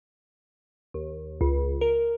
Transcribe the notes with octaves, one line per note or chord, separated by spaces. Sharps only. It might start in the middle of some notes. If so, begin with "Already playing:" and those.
D#2
C#2
A#4